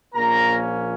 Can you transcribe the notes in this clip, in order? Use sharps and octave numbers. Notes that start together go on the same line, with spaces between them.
A#1 A#2 F3 A#3 C#4 A#4 A#5